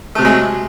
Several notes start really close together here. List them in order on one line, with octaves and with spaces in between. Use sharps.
A3 C3 F#3 G#3